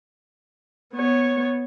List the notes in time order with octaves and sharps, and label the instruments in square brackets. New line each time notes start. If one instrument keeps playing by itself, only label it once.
[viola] B3 C#5